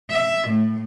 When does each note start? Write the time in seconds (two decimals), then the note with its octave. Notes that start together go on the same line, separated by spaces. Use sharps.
0.10 E5
0.49 A2